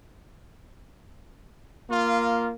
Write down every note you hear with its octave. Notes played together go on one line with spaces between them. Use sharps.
A#3 F4